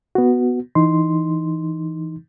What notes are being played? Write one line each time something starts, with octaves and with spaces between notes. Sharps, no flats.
B3 F#4
E3 D#4 C6